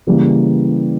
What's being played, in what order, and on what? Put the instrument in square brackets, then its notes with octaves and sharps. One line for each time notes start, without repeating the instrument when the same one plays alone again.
[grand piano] C#3 E3 G3 A#3